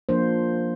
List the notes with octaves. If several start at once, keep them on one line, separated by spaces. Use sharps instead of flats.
F3 A#3 D4 C5